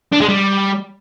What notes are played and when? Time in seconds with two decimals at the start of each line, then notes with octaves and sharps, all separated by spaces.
0.13 D4
0.21 G#3
0.29 G3